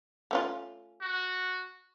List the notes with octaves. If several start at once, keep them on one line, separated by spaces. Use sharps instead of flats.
A3 C#4 F4
F#4